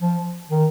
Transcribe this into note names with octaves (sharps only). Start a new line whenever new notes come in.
F3
D#3